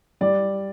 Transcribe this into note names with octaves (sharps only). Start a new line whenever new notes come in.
G3 D5